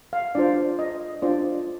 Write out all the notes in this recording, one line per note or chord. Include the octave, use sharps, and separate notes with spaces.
F5
D4 F4 C5 D5
D#5
D4 F4 C5 D5